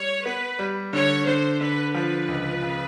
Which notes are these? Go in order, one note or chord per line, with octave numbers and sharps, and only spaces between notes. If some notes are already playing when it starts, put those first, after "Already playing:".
Already playing: G3 C#5
B3 B4
G3
D3 C#5
D3 C5
D3 B4
F3 B4
C#2
C#3